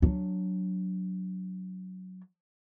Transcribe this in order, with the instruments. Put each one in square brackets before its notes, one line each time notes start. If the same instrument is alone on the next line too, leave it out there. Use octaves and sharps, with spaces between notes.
[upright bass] F#3 D4